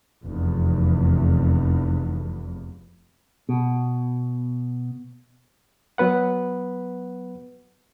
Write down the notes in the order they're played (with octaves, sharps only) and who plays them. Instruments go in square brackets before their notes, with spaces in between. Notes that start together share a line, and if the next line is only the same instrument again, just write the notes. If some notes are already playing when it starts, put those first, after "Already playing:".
[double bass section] F1 E2
[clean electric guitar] B2
[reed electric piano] F#3 B3 B4 F#5